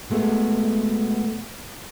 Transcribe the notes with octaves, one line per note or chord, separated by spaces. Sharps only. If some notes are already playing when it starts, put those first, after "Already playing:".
B2 G#3 A3 B3